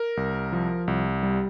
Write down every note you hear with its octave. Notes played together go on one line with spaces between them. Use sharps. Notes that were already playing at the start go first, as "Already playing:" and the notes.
Already playing: A#4
C2
F3
C2
G3